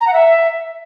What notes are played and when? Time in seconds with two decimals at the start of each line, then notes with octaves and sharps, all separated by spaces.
0.01 A#5
0.07 F#5
0.13 E5